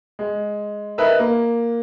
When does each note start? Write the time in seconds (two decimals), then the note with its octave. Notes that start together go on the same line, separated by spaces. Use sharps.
0.19 G#3
0.98 D#4 A#4 B4 D#5 E5
1.19 A#3